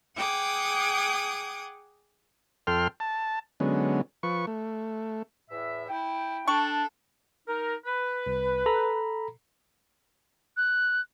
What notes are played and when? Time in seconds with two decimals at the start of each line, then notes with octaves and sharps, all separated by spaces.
0.16 G#4 F#5 G5 D6 D#6 G#6
2.67 F2 A4 G5 C6 F6
3.00 A5
3.60 D3 F#3 G#3 B3 C#4
4.23 F3 B4 C#6
4.47 A3
5.49 E2 A2 E5
5.89 E4 G5
6.48 D4 A4 C#6
7.48 D#4 A#4
7.86 B4
8.26 C2
8.66 A4 A#5 B5
10.57 F#6